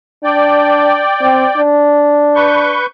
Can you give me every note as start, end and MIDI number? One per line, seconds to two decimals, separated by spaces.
0.24 1.03 62
0.24 1.62 74
0.24 1.62 79
1.21 1.45 60
1.57 2.80 62
2.35 2.86 71
2.35 2.86 85
2.35 2.86 91